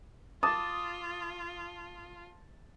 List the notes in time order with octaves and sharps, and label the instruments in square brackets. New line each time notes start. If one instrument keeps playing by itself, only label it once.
[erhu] F4 [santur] A5 [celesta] D6 [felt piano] D#6